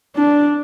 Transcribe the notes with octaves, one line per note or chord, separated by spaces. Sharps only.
D4